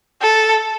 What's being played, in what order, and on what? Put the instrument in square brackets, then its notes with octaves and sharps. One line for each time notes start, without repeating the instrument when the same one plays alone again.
[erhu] A4